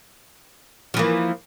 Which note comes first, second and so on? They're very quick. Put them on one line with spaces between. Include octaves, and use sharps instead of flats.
F3 E3 A#3